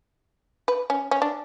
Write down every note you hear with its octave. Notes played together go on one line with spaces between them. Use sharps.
B4
C#4
C#4
D4